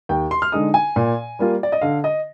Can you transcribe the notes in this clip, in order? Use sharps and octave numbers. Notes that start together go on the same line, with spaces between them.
D#2 G5
C6
F6
D3 G#3 D#4 D#6
G#5
A#2
G3 A#3 F4
D5
D#5
D3 F5
D#5